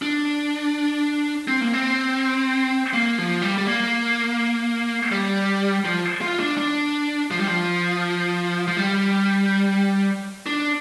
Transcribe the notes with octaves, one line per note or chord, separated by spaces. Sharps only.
D4
C4
A#3
C4
A#3
F3
G3
G3
A#3
G3
F3
F4
D4
D4
F3
G3
F3
F3
G3
D4